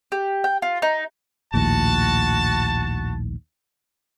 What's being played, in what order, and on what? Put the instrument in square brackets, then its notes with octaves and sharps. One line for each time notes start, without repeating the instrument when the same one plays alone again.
[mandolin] G4
G5
F4
D#4
[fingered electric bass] A#1 D#2 A2 [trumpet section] F#4 A5